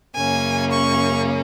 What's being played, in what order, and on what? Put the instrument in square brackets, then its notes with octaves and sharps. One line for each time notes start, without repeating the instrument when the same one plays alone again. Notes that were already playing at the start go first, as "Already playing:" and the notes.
[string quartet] F#2 C#3 A#3 C#4 G#5
C#6